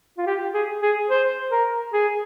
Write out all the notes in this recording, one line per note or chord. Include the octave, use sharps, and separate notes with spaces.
F4
G4
G#4
G#4
C5
A#4
G#4